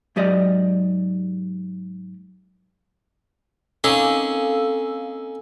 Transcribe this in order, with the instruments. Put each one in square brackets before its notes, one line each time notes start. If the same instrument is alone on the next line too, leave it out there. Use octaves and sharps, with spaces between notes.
[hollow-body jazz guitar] G#2 F#3 G4 D5 D#5
[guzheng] A#3 C4 [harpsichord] C#4 D#4 [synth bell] A4 E6 [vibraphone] F5 G#5